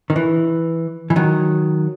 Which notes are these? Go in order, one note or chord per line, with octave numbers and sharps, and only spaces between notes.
D#3
E3
E3
D#3 F#3